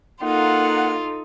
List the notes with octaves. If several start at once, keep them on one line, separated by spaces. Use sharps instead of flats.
A#3 D#4 F4 A4 F#5